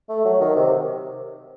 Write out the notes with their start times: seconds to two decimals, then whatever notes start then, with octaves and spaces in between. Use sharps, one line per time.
0.09 A3
0.25 F#3
0.41 D#3
0.56 C3